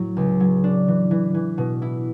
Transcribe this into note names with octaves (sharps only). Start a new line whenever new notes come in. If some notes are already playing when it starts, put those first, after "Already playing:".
Already playing: A2 F#3
C#2
F#3
D4
E3
E3
E3
B2
E4